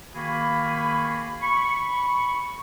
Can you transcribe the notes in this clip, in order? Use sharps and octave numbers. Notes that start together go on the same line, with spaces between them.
D#3 A#3 F#4 G#4 B5
B5 C#6